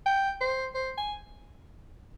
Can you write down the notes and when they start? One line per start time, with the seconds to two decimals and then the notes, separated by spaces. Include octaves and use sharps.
0.06 G5
0.41 C5
0.75 C5
0.98 G#5